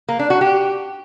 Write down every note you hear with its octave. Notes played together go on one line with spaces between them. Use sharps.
A#3
D4
F#4
G4